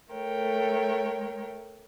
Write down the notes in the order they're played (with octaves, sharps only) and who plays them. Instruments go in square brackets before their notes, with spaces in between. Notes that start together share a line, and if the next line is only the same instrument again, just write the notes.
[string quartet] A3 A#4 C#5 G5